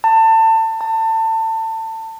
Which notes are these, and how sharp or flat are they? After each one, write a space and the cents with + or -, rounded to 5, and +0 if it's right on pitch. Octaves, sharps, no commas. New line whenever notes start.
A5 +25
A5 +25